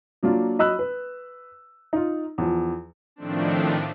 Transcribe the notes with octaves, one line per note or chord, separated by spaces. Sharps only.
F#3 A#3 D4 F4
F#3 D#5 B5 E6 F#6
B4
D#4 F4
E2 F3
A2 D#3 F3 A3 C4 D4